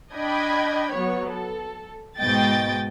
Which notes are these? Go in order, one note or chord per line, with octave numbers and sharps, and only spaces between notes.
D4 D#5 G5 B5 G#6
F#3 B3 C#5
A4
G#2 B2 D#5 G5 A6